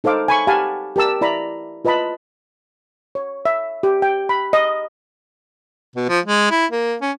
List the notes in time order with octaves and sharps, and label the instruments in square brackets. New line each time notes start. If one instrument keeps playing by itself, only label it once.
[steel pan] D#4 A4 C5 F5 D6
G#5 B5 C#6
G4 F5 F#5 G#5 A5 B5
G4 A#4 A5 E6
E4 D5 A#5 B5
F4 B4 D#5 A5 B5
C#5
E5
G4
G5
B5
D#5
[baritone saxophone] B2
F3
G#3
E4
A#3
C#4